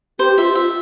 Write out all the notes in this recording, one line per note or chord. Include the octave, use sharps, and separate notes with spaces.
G4 C5
F4 E5
F4 E5